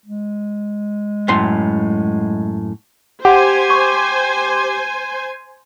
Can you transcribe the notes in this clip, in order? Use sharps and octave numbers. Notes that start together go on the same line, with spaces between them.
G#3
F#2 A2 C6
G4 C5 F#5 G#5
C#6